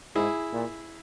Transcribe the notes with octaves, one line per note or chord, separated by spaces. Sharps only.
G#2 E4 G#4
A#2